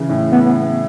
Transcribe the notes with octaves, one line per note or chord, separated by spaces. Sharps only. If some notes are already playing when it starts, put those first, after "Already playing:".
Already playing: C#3 E3
A2
B3